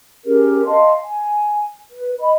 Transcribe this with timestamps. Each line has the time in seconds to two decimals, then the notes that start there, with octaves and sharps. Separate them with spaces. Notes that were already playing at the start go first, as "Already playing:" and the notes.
0.25 C#4 G4 G#4 A#4
0.66 D#5 F5 A5 C6
1.04 G#5
1.91 B4
2.20 D#5 B5